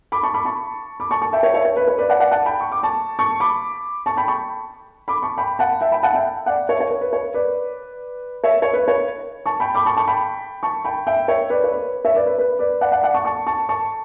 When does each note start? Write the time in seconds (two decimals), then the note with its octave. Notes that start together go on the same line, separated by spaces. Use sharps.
0.12 B5 D6
0.23 A5 C#6
0.34 B5 D6
0.45 A5 C#6
1.00 B5 D6
1.11 A5 C#6
1.22 A5 C#6
1.33 E5 G5
1.43 C#5 E5
1.54 C#5 E5
1.65 C#5
1.77 B4
1.88 C#5
1.98 B4 D5
2.09 D5 F#5
2.20 D5 F#5
2.31 F#5 A5
2.46 G5 B5
2.61 C#6
2.71 D6
2.83 A5 C#6
3.19 A5 C#6
3.40 B5 D6
4.06 A5 C#6
4.17 G5 B5
4.28 A5 C#6
5.08 B5 D6
5.23 A5 C#6
5.38 G5 B5
5.59 F#5 A5
5.81 E5 G5
5.92 G5 B5
6.03 F#5 A5
6.14 E5 G5
6.46 D5 F#5
6.69 C#5 E5
6.80 C#5
6.91 C#5
7.01 B4
7.13 C#5
7.34 B4 D5
8.44 C#5 E5
8.62 C#5
8.73 B4
8.88 C#5
9.46 A5 C#6
9.60 G5 B5
9.75 B5 D6
9.86 A5 C#6
9.97 A5 C#6
10.08 G5 B5
10.63 A5 C#6
10.85 G5 B5
11.07 E5 G5
11.28 C#5 E5
11.50 B4 D5
11.64 C#5
11.72 B4
12.05 C#5 E5
12.15 B4 D5
12.26 B4
12.38 B4
12.59 B4 D5
12.81 D5 F#5
12.92 D5 F#5
13.03 D5 F#5
13.14 A5 C#6
13.25 A5 C#6
13.47 A5 C#6
13.69 A5 C#6